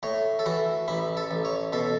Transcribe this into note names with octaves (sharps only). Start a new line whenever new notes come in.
A2 C#5
A4
E3 F#4
A1 E4
A4
A1
C#5
B2 A4